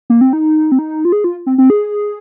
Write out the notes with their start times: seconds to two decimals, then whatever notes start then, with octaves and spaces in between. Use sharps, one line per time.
0.10 A#3
0.21 C4
0.33 D#4
0.72 C4
0.79 D#4
1.05 F4
1.12 G#4
1.24 F4
1.46 C4
1.58 C4
1.70 G#4